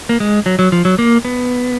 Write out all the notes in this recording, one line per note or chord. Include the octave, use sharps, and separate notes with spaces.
A#3
G#3
F#3
F#3
F3
F#3
A#3
B3